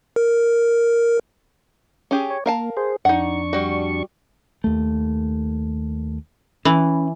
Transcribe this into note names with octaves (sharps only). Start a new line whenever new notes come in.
A#4
C#4 G4 G#4
C#5
A#3 A#4 F5 A5
G#4 C5
F2 D4 D#4 F#5 C#6
G3 F#4
D#2 A3
E3 C#4